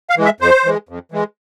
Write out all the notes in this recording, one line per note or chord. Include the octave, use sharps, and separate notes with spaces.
F5
E3 G#3
E5
F2 C5
E3 G#3
F2
E3 G#3